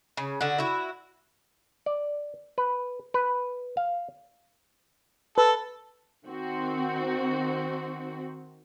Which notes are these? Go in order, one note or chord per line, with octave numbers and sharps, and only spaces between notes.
C#3
D3 F#4
E4 F#4
D5
B4
B4
F5
A4 B4
D#3 C4 F#4